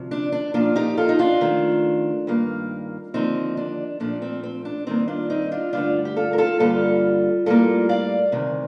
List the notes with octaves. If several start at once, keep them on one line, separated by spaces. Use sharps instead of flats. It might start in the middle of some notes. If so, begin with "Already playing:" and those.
Already playing: D2 C3 F3
D4
D4
A#2 F3 A#3 D4 F4
D#4 G4
F4 A4
D#4
D4 F4
F2 D#3 A3
G2 D#3 A#3
D#2 D3 F3 A#3 C4 D#4
D4
A#2 F3 A3 D4
C4
C4
D4
G2 D#3 A#3 C4 D#4
D4 F4
C4 D#4
D4 F4
G2 D3 A3 D4 F4
G4
F4 A4
A#4
F4 A4
G2 D3 G3 A#3 F4 A4
A2 G3 A#3 F4 A4
D5 F5
D2 C3 D#3